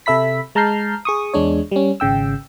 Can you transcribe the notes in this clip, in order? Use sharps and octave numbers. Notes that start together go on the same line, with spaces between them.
C3 A4 E5 B5 B6
G#3 A5 A#5 F6 G6 C7
G#4 C#6 D#6
E2 G#3 D4 C#5
G3 C#4
G#1 C#3 G5 E6